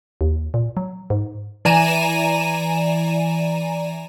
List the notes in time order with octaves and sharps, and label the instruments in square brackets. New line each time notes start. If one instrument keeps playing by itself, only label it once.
[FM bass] D#2
A#2
F#3
G#2
[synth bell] E3 D5 G#5 A#5 D#7 E7